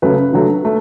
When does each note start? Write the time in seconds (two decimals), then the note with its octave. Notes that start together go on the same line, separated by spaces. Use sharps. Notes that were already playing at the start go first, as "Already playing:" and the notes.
0.02 C#3 F#3 A3 B4
0.33 D3 F#3 A3
0.65 A3